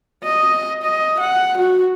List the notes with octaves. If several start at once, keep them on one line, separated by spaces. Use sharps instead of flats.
D#5
D#5
F#5
F#4